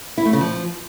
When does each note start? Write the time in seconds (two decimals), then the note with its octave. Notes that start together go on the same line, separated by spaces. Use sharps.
0.18 E4
0.25 A3
0.33 C#3
0.41 F3